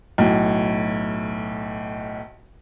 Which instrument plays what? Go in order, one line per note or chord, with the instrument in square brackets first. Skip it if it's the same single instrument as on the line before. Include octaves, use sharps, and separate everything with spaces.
[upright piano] B1 A2